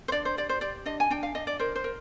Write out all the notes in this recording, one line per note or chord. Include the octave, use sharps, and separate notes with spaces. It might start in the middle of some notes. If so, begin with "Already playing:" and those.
C5
D4 D5
C5
G4 D5
C5
G4 D5
D4 D#5
G#5
D4 G5
F5
D4 D#5
D5
A#4 C5
C5
A#4